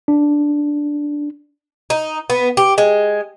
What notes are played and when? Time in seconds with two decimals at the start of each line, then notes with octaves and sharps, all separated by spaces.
0.08 D4
1.90 D#4
2.30 B3
2.57 G4
2.78 G#3